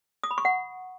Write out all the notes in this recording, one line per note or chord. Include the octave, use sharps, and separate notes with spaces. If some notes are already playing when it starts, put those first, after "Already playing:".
D#6
B5
C#6
F#5